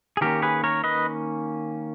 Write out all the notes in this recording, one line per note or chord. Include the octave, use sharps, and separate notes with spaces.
G#4
D#3 A#3 C#4 G4 A#4
G#4 B4
A#4 C#5
B4 D#5